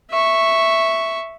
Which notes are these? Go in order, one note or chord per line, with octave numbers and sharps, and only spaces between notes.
E5 C#6